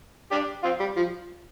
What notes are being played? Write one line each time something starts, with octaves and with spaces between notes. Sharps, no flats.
D4 G4
C4 F4
G3
F3